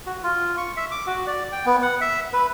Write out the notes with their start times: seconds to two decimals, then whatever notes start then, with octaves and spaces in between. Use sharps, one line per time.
0.06 F#4
0.23 F4
0.58 C#6
0.77 E5
0.91 D6
1.07 F#4
1.27 D5
1.52 G5
1.66 B3
1.82 F#5
2.01 E5
2.33 B4